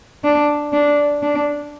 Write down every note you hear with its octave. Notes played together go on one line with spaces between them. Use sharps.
D4
D4
D4